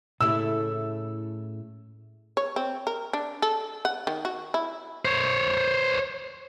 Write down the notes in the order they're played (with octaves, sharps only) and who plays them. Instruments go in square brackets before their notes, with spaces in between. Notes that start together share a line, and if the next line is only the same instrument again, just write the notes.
[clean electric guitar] A2 [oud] C#3 A3 E4 [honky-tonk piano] E6
[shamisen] C#5
C4
A#4
D4
A4
F#5
D#3
F#4
E4
[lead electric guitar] C5 C#5